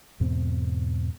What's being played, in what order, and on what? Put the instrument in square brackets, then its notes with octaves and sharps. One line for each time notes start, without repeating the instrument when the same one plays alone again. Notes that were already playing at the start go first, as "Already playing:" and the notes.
[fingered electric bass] E2 G#2 B2 C4